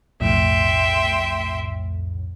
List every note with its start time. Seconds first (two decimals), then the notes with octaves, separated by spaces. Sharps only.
0.21 B1 F2 A2 E5 G5 C6